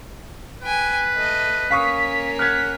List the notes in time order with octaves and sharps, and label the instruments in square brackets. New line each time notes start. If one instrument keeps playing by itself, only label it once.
[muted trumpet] B4 [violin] G5 G#5
[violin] A3 D#5
[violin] A#3 C#4 [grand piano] F5 C#6 D#6 [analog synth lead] B6
[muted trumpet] F#5 [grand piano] F6 G#6